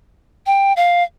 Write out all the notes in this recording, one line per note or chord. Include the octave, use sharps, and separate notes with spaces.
G5
F5